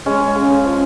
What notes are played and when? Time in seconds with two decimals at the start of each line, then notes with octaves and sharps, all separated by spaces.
0.06 G#3 C#4
0.21 C#4
0.35 C#3
0.50 C#3
0.65 F3